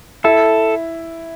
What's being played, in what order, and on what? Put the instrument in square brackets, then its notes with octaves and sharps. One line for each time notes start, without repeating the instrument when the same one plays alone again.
[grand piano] E4 [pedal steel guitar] A4